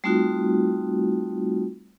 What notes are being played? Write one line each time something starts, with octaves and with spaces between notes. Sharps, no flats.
G3 A3 C4 D#4 F4 F#4